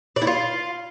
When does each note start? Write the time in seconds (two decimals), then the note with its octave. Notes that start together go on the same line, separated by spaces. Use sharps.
0.16 D5
0.22 E4
0.27 F4